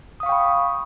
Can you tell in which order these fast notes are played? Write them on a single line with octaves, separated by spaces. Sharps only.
D#6 F5 C#6 G5 B5